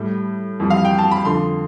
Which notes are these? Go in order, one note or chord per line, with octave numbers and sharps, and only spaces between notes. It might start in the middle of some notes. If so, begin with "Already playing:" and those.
Already playing: A2 G3
F2 E3 G3
F5
G5
A5
B5
F2 D3 F3 C6